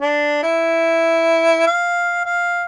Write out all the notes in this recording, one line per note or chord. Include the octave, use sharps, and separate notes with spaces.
D4
E4
F5
F5